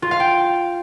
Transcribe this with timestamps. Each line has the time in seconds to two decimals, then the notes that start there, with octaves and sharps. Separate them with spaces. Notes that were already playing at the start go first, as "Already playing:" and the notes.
0.02 F4
0.11 F5
0.20 G5